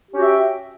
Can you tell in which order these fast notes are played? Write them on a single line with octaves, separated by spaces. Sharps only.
G4 C#4 F#4 E5 G5